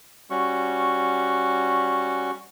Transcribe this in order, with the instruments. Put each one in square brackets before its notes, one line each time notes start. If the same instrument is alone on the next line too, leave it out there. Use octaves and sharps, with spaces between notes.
[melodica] G3 C#4 F#4 C#6